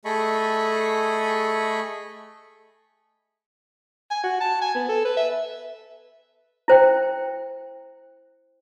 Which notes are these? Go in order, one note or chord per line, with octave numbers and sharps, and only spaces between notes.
A3 G#4 A4 D#5 B5 C#6
G#5
F#4
A5
G#5
B3
A4
B4
E5
E4 C5 G5